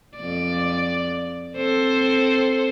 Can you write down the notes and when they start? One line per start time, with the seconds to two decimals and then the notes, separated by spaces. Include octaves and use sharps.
0.18 F2 D5
1.57 C4 A4 C5